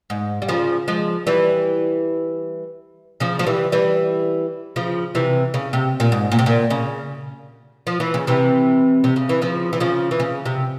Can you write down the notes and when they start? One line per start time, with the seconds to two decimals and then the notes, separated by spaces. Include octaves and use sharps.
0.10 G#2
0.42 G3
0.49 C#3 F3
0.88 F3 G#3
1.27 E3 G3
3.20 C#3 F3
3.39 F3
3.47 E3 G3
3.72 E3 G3
4.76 C#3 F3
5.15 C3 E3
5.54 C#3
5.73 C3
6.00 A#2
6.12 G#2
6.32 A#2
6.39 C3
6.46 A#2
6.70 C#3
7.87 F3
8.00 E3
8.14 C#3
8.27 C3 E3
9.04 C3
9.16 C#3
9.29 E3
9.42 C#3 F3
9.73 E3
9.80 C#3 F3
10.11 E3
10.20 C#3
10.45 C3